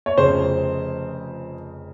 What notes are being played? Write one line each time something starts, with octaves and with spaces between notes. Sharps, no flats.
C#5
F1 F2 C#3 C5